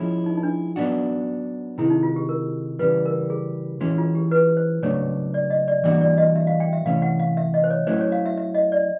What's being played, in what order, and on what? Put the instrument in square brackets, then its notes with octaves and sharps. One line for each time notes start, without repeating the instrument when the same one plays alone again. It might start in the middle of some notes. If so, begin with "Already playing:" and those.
Already playing: [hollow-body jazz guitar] F3 G#3 C#4 E4
[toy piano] D#4
D#4
D4
[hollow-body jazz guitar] F#3 B3 D4 F#4
[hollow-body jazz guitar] C3 D#3 G#3 [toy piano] E4
[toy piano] D#4
F4
G4
A#4
[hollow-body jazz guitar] C#3 E3 G3 [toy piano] B4
[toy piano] A#4
G#4
[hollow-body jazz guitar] E3 G#3 C#4 E4 [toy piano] F#4
[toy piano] F4
G4
B4
C5
[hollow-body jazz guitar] C#3 F#3 A3 D4 [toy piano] C#5
[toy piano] D5
D#5
D5
[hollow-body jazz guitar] E3 G3 A#3 D4 F#4 [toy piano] D5
[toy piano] D5
D#5
E5
F5
G5
E5
[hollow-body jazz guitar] C3 E3 A3 C#4 [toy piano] F5
[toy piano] F#5
F5
E5
D#5
C5
C#5
[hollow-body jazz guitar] F#3 A3 C#4 E4 [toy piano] C5
[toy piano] C#5
F5
E5
E5
D#5
D5